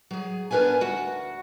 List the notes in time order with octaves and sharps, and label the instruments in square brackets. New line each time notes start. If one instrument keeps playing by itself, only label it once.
[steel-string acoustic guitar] F#3 G#4
B3 D4 A#4 B4 F5 G#5
D2 F#4 F#5